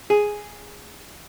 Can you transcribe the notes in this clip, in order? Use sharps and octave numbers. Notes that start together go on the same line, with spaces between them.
G#4